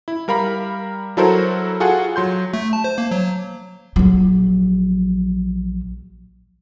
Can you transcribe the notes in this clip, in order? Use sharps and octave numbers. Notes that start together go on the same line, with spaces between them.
E4
G3 A#4 F5 B5
F#3 E4 F#4 A4 A#4 C5
F4 F#4 G#4 A4 F#5
F#3 C6 G6
A3
A5
C5
A#3
F#3
A#1 F#3